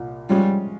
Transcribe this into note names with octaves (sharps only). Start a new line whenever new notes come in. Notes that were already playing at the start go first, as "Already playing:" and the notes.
Already playing: C2 A#2
F3 G3 G#3 C#4 F4